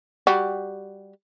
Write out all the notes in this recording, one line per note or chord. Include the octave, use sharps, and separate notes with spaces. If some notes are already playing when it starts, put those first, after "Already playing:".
G3 F#4